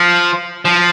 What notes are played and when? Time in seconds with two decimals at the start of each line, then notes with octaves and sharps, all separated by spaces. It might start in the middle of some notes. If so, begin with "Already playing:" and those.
Already playing: F3
0.65 F3